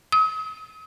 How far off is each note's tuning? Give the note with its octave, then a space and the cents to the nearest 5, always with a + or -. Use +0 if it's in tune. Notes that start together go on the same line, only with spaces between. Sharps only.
D#6 +45